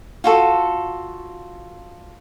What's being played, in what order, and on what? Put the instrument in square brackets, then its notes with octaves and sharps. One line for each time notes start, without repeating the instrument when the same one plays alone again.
[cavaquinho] F4 F#4 A4